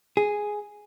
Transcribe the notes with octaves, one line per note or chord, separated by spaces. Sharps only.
G#4